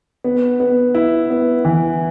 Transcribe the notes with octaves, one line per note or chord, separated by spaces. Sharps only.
B3
B3
E4
B3
E3